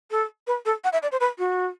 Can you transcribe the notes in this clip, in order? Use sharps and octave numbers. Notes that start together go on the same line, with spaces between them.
A4
B4
A4
F#5
E5
D5
C5
B4
F#4